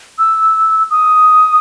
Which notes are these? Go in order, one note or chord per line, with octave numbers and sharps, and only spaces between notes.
E6
D#6